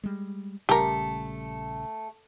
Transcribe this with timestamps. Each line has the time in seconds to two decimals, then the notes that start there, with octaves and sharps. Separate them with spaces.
0.04 G3 G#3
0.69 A#1 C#3 G3 A3 G4 A#4